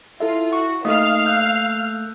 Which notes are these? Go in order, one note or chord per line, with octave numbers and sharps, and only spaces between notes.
E4 F4 A4 E5
F#4 C#6
A3 A#3 D#4 A4 D#5 F5 D#6 F6
E6 F#6 G6